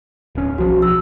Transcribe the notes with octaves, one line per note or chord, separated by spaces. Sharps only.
D1 C#4
B1 F3 F#4
E6